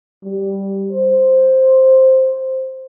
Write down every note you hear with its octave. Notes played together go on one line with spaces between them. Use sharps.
G3
C5